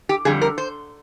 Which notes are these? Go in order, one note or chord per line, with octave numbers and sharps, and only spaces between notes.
G4
F2 D3 G3 G#4
A#4
C5